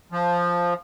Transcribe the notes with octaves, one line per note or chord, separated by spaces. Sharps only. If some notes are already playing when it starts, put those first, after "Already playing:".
F3